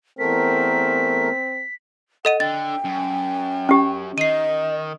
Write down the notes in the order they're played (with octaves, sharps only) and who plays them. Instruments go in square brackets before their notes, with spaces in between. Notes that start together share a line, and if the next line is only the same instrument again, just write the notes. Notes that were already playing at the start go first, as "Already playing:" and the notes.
[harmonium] E2 A3 A#4 [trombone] C4 [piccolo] B6
[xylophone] A4 D#5 D#7 [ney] F#5
[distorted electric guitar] D3 [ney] G5 [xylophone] A6
[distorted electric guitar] F#2
[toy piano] C#4 G4
[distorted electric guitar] D#3 [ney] D#5 [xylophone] C7 D#7